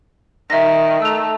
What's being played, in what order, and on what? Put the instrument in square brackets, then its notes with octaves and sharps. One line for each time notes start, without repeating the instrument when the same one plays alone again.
[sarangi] D#3 [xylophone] E5 A#6
[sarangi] A3 [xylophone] E6 F7